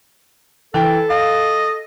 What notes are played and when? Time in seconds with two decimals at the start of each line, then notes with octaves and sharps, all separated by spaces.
0.74 E3 A4 G5
1.10 D#5 F5